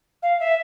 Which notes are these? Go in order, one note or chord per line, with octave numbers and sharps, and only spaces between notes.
F5
E5